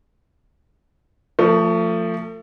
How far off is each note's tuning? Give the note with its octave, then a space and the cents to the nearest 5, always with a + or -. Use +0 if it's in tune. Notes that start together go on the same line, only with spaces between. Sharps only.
F3 +0 A3 +30